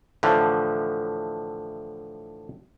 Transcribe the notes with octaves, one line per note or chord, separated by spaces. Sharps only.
A2 D3 E3 F3